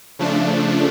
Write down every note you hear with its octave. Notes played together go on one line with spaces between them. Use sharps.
C#3 F3 A3 D4